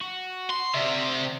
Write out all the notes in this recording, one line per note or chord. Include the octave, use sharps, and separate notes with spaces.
F#4
C6
C3 D5 E5